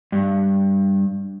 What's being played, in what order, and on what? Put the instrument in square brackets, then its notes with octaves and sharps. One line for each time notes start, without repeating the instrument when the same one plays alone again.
[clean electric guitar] G2